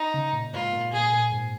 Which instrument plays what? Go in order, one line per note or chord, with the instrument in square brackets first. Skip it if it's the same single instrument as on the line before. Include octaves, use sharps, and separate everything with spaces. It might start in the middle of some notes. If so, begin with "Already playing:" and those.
Already playing: [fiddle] D#4
[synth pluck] C#3
A#2
[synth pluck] G#2 [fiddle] F4
[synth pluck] A#2
[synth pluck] A#2 [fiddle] G#4
[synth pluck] A#2
G#2